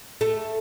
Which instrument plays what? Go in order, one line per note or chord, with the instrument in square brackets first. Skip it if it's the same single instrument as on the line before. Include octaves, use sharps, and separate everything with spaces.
[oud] A3